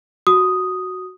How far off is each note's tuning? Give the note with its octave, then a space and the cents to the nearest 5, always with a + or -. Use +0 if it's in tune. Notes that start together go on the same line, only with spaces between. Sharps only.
F#4 +0 D#6 +0